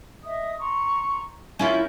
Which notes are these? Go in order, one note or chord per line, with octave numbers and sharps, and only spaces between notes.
D#5 E5 D#6
A#5 C6 C#6
C#4 E4 F4 A#4 G6